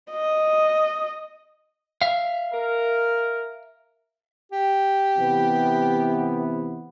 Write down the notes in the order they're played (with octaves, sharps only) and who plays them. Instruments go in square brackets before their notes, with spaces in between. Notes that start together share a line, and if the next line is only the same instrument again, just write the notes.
[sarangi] D#5
[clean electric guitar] E5 F5
[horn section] A#4
[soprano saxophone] G4
[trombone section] C3 E3 B3